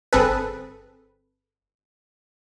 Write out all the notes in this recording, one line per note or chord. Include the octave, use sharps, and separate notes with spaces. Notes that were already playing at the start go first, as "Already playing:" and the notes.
G1 C4 G#4 A4 B4